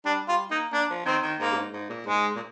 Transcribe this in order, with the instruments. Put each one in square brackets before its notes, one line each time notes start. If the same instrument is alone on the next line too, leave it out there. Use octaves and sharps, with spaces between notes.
[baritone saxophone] G3 [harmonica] D4
[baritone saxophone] G3 [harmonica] F4
[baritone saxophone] A#3 [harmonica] D#4
[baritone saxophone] A#3 [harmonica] D4
[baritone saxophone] F3
[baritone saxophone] D#3 [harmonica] C4
[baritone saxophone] D#3
[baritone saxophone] G#2 [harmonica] A#3
[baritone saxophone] G2
G#2
G#2
A#2
[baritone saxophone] G#2 [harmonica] G#3
[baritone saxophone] A#2